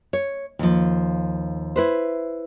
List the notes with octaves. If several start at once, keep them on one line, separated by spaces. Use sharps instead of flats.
C#5
D#2 F3
E4 B4 C5